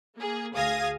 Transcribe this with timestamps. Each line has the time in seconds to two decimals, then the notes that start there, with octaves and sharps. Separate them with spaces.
0.17 A#3 G#4
0.54 D2 G#4 F5 D#6 G#6 A#6